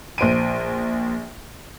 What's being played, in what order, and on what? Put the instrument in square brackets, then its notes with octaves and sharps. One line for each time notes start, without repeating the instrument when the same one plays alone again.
[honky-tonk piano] A#1 C5 D7 D#7